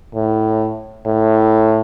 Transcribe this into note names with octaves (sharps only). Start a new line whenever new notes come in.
A2
A2